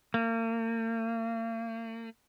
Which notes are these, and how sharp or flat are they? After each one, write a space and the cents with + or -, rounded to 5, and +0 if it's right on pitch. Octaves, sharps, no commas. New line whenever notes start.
A#3 -40